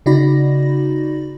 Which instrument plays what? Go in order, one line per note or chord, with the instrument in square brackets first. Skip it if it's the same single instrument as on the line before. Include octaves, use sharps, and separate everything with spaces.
[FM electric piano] C#3 D#4 F#4 D5 B5 A#6